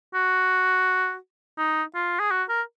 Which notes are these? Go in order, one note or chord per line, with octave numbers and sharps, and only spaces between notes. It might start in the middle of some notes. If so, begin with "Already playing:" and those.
F#4
D#4
F4
G#4
F#4
A#4